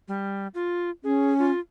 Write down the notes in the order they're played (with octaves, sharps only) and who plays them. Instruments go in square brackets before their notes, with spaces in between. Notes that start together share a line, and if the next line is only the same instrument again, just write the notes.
[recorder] G3
F4
[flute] C#4 [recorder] G#4
[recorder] F4